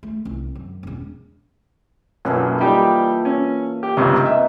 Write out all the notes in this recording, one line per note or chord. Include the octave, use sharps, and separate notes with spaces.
A3
C2
F#2
E1 C#3
B1 F#2 A#2 E3 A4
G3 D#4 G4
C#4
G4
C#2 G2 C3 D#4
E5